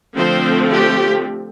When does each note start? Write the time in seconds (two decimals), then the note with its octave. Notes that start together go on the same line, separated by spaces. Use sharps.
0.16 D3 F3 A3 C4 C5
0.71 G4